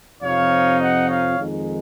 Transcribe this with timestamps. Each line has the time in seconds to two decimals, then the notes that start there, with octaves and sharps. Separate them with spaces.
0.23 F2 C3 F3 C4 D#4 C#5 F5
0.80 D#5 F#5
1.09 C#5 F5
1.38 F2 D#3 G#3 D#4